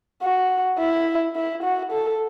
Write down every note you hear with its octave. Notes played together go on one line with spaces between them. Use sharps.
F#4
E4
E4
F#4
A4